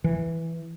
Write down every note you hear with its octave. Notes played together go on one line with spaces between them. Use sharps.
E3